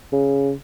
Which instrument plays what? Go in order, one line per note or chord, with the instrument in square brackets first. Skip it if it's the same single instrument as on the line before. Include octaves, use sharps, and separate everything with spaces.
[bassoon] C#3